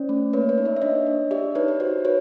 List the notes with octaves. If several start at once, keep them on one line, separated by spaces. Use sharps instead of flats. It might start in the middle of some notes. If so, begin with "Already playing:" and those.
Already playing: C#4 C5 D5
A3
A#3 B4 C#5
B4 C#5
D#4
D5 E5
E5
D4 C#5 D#5
D4
G4 D5 E5
D#4 B4 C#5
B4
F#4 C5
F#4 B4 C#5